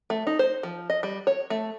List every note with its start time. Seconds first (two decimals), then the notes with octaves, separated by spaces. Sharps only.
0.10 A3
0.27 D#4
0.39 C5
0.63 F3
0.90 D#5
1.03 G3
1.27 C#5
1.50 A3